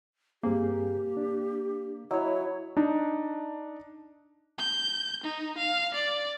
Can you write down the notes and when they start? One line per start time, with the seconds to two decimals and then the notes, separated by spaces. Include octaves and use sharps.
0.43 G2 A#3 C4 G4 G#4
1.17 D4
2.11 F#3 E4 C#5 D#5
2.77 D4 D#4
4.58 G6
5.24 D#4
5.57 F5
5.94 D5